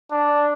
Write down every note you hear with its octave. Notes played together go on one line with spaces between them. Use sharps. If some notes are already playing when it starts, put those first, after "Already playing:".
D4